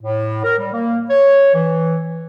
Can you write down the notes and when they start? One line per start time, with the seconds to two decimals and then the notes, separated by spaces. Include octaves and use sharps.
0.02 A2
0.44 A#4
0.58 G3
0.73 A#3
1.10 C#5
1.54 E3